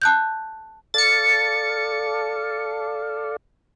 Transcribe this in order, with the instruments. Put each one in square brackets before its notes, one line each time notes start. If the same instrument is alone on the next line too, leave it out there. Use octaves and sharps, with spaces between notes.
[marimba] A5 F#6 G6
[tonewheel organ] A4 D5 F5 [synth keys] A6 C#7